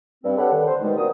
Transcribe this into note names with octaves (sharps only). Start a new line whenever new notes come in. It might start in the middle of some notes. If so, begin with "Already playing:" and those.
G2 C4
G4 A4 B4 C#5 F#5
D3 D#3
C5
G2 B2 D#3 G3 G#3
A#3 C4 D4 F#4 A#4 D#6